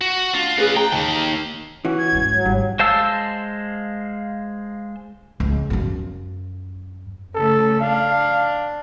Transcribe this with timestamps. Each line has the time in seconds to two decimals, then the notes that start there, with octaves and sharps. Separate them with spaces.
0.01 F#4
0.35 D4 F4
0.58 C#3 F4 G#4 B4
0.76 G5 A#5
0.92 D#2 D#3 A5
1.85 E3 C#4 F#4
1.98 G#6
2.12 G#2 G#3
2.33 F#3
2.46 G#1 G2
2.79 G#3 C5 F5 A5 E6
5.40 C#2
5.70 F#2 F4
7.35 C#3 A3 A4
7.81 D4 F5